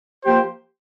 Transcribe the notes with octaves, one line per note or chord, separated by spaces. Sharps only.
F3 A#3 G4 C5